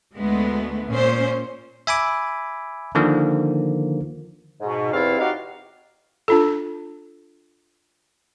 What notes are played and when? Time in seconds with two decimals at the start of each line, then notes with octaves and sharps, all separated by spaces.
0.19 D2 G#3 A3 B3
0.91 A#2 C#4 C5
1.87 E5 G#5 B5 D6
2.95 D3 D#3 F3 A#3
4.61 G#2 B2
4.92 E2 C3 C4 E4 A4 F5
5.19 D#4 F#4 G4 F5
6.28 D4 F4 A4